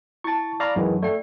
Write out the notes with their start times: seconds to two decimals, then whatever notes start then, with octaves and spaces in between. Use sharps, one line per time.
0.24 E4 A5 C#6 A6
0.60 D5 F5 A#5 B5 C#6 E6
0.76 F#2 D#3 E3 G#3
1.02 A3 D5 G5